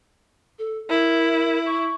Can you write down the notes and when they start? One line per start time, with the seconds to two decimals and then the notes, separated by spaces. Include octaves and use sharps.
0.59 A4
0.90 E4 A#4
1.66 C#6